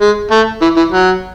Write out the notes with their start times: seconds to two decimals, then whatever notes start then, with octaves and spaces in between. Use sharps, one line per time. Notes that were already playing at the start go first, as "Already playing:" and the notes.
0.01 G#3
0.31 A3
0.62 E3
0.77 E3
0.92 F#3